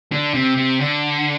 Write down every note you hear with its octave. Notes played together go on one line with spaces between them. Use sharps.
D3
C3
C3
D3